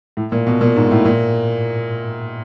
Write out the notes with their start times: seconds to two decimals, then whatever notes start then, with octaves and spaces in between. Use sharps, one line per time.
0.17 A2
0.32 A#2
0.47 B2
0.61 A#2
0.76 G#2
0.91 A2
1.05 A#2